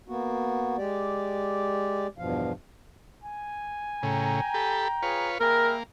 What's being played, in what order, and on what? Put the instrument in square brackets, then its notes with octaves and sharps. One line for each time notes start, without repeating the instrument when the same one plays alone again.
[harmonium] A#3 B3 F#4
G#3 G4 D5
E2 G2 B2 F3 F5
[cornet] G#5
[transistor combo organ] A2 C#3 [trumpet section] G5 A#5
[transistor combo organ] G4 A4 B5
[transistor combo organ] F4 B4 C#5 [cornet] G#4
[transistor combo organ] A#3 [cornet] G#4 [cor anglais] A#4 [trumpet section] E5 G5 B5